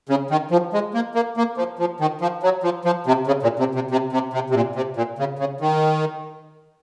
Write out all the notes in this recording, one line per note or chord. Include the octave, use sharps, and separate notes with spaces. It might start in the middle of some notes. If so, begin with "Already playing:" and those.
C#3
D#3
F3
G#3
A#3
A#3
A#3
F3
F3
D#3
F3
F#3
F3
F3
C3
C#3
A#2
C3
C3
C3
C3
C3
C3
A#2
C3
A#2
C#3
C#3
D#3